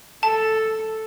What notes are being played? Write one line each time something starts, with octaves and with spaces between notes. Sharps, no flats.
A4 A5